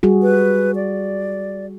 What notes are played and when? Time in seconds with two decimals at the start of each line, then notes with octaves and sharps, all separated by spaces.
0.03 G3 F#4 G#4
0.22 B4
0.76 D5